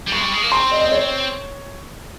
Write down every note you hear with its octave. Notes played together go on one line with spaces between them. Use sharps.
G3
G#3 C#6
G3
G#3
A#3
C4 C6
D#5
D#5
C#5